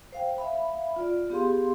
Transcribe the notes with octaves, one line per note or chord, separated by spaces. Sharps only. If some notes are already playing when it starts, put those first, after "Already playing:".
C5 F5 G5
E5 F5 B5
F4 D5
B3 G4 G#4 F5 C6